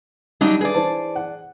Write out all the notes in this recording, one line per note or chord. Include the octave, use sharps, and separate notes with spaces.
F#3 G3 D4 D#4
G#4 B4 D5
E3 C5 A5
F#5